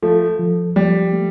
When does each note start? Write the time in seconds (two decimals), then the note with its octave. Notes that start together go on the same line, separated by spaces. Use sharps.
0.03 F3 A3 A4
0.39 F3
0.76 F3 G3
1.13 A3